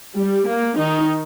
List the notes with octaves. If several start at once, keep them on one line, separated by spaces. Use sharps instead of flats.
G3
A#3
D#3 D#4